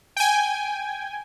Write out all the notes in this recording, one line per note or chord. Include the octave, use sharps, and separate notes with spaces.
G5 G#5